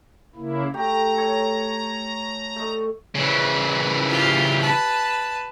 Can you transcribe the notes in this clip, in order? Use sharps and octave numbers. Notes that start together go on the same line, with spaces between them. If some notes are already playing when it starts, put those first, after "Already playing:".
C#3 A#3 E4
A3 G4 A#5
A4 C#5
A3 D#5
C#3 E3
F4 G4
B4 A5